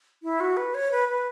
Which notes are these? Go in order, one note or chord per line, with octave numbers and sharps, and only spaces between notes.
E4
F#4
B4
C#5
B4
B4